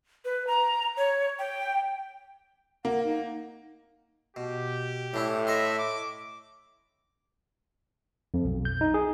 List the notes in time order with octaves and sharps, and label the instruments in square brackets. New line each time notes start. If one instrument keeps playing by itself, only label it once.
[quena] B4
A#5
C#5
G5
[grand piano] A#3 [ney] F#5
[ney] D#4
[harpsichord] B2 [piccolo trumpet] G4
[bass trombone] A2 [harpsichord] E3 D4 E4
[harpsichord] A4 D#5 C6 [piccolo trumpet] E5
[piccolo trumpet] D6
[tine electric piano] F2
B1
G6
D#4
G#4